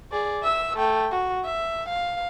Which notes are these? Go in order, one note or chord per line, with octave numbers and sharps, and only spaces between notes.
G#4 D5
E5 E6
A3 G5
F#4
E5
F5